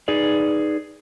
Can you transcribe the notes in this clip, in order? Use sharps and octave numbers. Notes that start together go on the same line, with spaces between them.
D#4 G#4 B4 D5